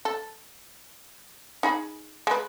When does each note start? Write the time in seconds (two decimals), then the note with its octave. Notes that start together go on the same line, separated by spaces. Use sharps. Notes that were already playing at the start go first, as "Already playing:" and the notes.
0.05 A4
1.63 D#4 G#4 B5
2.27 G#3 B4